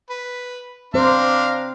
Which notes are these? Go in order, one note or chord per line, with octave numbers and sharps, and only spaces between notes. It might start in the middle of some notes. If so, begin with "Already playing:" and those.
B4
C4 D4 C5 F5 A#5